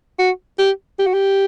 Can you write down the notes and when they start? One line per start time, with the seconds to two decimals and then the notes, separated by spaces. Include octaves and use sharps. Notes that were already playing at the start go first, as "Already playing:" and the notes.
0.19 F#4
0.59 G4
0.99 G4
1.06 F#4
1.13 G4